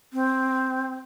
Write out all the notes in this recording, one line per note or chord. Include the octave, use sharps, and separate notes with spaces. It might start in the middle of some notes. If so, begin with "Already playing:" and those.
C4